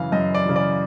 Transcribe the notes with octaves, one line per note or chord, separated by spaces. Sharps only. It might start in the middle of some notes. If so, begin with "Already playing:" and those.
Already playing: F#2 C#3 E3 F5
F#2 D#5
D5
C#3 E3
D5